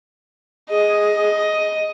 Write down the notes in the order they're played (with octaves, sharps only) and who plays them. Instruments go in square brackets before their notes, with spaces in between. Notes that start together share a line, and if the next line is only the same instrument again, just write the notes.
[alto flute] G#4 [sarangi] D#5